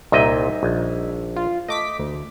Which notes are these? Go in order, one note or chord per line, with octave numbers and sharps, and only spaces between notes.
C2 A#2 G3 D#4 D#5 E5
A#1
F4
A3 D#5 D6 B6
D2